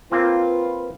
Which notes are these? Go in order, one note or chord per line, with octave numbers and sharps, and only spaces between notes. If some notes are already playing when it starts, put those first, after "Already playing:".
A#3 C4 F4 B4